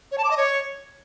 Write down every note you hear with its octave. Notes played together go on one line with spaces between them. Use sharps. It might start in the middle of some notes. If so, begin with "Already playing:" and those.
C#5
A5
D6
D#5
C#5